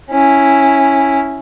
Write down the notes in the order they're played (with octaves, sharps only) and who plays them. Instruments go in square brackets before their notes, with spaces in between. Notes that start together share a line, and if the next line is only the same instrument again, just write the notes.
[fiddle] C#4 E4